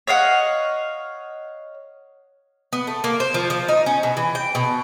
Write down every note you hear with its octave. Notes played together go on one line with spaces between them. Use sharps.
C#5 D#5 F5 F#5
B3
A3
A#3
C5
F3
F3
D#4
C#4
B2
E3
G5
B2